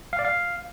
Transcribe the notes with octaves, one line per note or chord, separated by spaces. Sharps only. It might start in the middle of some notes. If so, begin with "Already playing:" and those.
F5
D5
F5